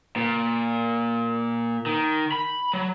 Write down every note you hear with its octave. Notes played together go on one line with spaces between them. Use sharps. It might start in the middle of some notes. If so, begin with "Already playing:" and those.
A#2
D#3
B5
F#3